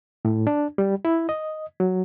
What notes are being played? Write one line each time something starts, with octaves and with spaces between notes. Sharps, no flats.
A2
D4
G3
E4
D#5
F#3